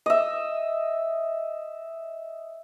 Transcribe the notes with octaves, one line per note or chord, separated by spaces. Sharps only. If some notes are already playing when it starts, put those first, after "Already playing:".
D#5 E5